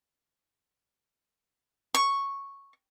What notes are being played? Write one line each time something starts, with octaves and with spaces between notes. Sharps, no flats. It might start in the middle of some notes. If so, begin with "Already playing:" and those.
C#6